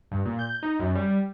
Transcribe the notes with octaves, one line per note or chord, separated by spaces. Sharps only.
G2
A#2
G6
D#4
F#2
G3